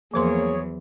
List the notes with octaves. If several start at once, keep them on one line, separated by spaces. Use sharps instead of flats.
E2 F3 F#3 A#3 G#4 C5 C#5 C6